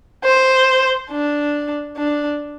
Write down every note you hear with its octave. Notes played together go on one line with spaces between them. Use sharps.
C5
D4
D4